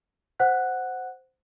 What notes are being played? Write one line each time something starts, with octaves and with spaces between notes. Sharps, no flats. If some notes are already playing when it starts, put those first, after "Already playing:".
C5 F#5 F#6